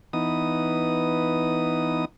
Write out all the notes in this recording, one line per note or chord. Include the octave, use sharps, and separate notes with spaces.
E3 B3 D#4 D#6